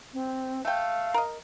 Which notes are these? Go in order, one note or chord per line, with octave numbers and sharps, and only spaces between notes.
C4
A3 F5 G5
A#4 D#5